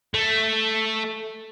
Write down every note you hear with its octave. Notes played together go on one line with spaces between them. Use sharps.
A3